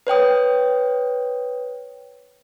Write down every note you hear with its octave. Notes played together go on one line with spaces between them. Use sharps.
B4 C#5 G5 D#6